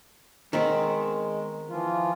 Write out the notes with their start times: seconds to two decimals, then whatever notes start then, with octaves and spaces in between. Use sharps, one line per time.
0.53 D#3 G#3 B3 C4
1.69 E3 F3 F4